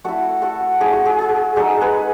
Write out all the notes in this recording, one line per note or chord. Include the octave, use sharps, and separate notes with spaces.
A3 E4 F#4 A4
F#4 A4
A3 E4 G#4
F#4
G#4
G#4
G#3 D#4 F#4 A4
G#4 B4